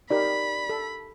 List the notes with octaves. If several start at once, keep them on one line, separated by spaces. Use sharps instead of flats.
D#4 G4 A#4 D5 B5
A4